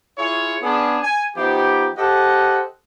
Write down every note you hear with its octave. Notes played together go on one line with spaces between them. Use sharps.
E4 F4 G#4 C#5
B3 C#4 D4 G#4
G#5
F3 B3 D#4 G4
G4 A4 C5 D#5 F#5